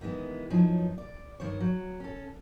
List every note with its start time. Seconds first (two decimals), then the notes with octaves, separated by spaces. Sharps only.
0.01 D#3 E3 G#3 B3
0.50 F#2 F3 F#3 D#4
0.98 D5
1.40 G2 D#3 C5 C#5
1.61 F#3
2.00 C#4 A4